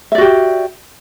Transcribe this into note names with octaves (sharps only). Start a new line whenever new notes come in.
F#4 G4 D5 E5